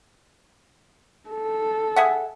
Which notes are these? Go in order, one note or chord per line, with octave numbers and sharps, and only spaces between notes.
A4
G#4 E5 F#5